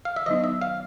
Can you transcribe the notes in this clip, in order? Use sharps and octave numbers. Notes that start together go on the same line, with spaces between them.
F5
E5
D#3 F#3 B3 D#4 D#5
E5
F5